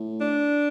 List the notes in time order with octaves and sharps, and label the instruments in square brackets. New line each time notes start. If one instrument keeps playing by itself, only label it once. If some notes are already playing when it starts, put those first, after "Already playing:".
Already playing: [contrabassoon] A2
[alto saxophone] D4